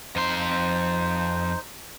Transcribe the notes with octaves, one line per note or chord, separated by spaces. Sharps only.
F2 D#4 C5 C6